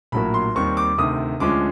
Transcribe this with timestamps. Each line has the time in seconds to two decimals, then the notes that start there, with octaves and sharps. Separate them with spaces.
0.12 A#1 A2 F#3 A#3 B5
0.34 C6
0.55 D#2 D#3 G3 C4 C#6
0.77 D6
0.98 D2 C3 D#3 D#6
1.40 D2 D3 F3 G#3 C#4 D6